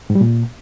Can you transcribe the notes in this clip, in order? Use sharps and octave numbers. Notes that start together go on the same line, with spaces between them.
G#2
G3
A#2